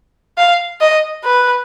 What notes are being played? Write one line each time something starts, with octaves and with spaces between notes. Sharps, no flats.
F5
D#5
B4